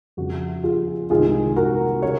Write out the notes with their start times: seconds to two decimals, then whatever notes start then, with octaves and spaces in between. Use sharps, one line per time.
0.17 F2 C#3 F3 F#4
0.64 F4 G#4
1.10 C2 C3 D#3 G#3 F4 G#4
1.56 F#4 A#4
2.02 C#3 A#4 C#5